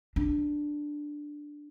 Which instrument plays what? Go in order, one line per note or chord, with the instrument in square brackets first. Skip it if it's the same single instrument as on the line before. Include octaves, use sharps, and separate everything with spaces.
[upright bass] D4